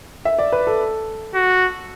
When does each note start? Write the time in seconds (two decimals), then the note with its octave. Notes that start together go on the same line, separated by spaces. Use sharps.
0.25 E5
0.39 D5
0.52 B4
0.67 A4
1.34 F#4